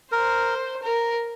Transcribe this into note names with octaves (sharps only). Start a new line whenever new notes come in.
A#4 C5
A#4